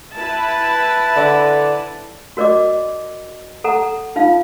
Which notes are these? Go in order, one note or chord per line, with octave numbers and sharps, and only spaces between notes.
E4 B4 A5
D3
F#4 A#4 D5 D#5 D6
A4 F#5 A#5
D#4 F4 F5